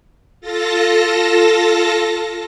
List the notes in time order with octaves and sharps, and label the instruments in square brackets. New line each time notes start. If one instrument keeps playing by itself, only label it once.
[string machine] F4 A4 A5 A#6